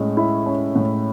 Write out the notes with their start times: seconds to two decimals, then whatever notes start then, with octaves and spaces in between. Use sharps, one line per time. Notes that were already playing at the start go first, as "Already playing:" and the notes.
Already playing: A2 G#3 C#4
0.17 E4
0.46 C#4
0.76 A2